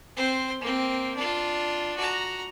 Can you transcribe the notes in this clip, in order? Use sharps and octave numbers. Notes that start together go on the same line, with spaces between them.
C4 C5
A#3 C4
D4 F4
F#4 A#5